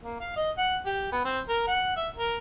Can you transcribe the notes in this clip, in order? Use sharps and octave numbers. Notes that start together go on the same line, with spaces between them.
A#3
F5
D#5
F#5
G4
B3
C4
A#4
F#5
E5
A#4